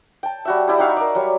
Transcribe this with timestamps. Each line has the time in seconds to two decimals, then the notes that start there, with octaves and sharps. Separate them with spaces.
0.23 G5 A5
0.45 G3 F#4 E5
0.67 G3 E4 G4
0.79 D#4 F#4 E5 F5
0.97 A#4 D5
1.15 F#3 G3